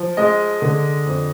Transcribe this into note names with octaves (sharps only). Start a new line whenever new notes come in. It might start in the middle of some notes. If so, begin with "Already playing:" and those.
Already playing: F3
G#3 D#5
D3
F2